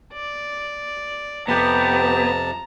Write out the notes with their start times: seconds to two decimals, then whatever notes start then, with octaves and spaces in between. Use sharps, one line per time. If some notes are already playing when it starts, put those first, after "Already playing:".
0.13 D5
1.48 F2 C3 B3 G4 A5 A#5